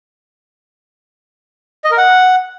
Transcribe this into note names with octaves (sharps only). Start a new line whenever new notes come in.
D#5
A#4
F#5